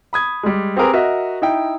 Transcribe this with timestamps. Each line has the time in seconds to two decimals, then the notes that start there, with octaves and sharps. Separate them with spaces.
0.13 B5 D#6 G#6
0.43 G3 G#3
0.77 C4 G4 G#4 A#4 B4
0.93 F#4 A#4 D#5 E5
1.42 D#4 E4 G5